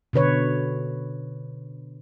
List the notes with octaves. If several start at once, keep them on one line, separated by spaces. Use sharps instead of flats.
B2 D3 B4 C#5